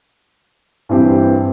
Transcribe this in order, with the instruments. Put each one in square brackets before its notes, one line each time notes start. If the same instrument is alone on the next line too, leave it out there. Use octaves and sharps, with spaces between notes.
[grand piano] G2 E3 C4 G4